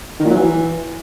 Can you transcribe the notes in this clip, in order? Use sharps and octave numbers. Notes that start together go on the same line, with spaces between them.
D#3
A#2
F#3
E3